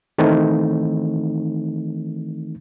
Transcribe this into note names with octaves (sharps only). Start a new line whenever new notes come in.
D#3 E3 A3 C4 D#4